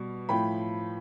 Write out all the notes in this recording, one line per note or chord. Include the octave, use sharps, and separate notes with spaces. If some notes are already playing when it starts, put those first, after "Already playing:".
Already playing: B2 G3
A2 F3 G5 B5